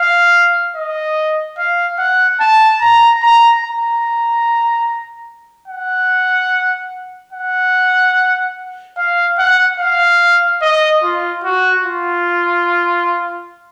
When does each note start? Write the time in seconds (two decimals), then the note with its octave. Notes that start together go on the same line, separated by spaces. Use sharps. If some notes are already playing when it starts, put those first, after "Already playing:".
Already playing: F5
0.76 D#5
1.58 F5
1.99 F#5
2.40 A5
2.81 A#5
3.23 A#5
3.63 A#5
5.68 F#5
7.33 F#5
8.97 F5
9.39 F#5
9.79 F5
10.62 D#5
11.03 F4
11.44 F#4
11.85 F4